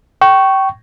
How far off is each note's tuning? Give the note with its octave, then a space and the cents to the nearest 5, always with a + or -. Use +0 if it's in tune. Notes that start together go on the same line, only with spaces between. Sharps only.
G5 -25 C#6 +0